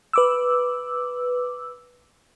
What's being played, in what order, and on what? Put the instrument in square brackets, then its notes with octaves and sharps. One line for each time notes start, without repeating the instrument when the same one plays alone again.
[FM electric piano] B4 D6 E6